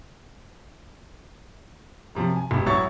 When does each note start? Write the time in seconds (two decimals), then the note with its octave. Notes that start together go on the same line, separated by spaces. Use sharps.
2.15 F#2 C3 F3
2.36 G#5
2.51 E1 G4
2.66 A1 F#3 E4 C#5 C#6 A6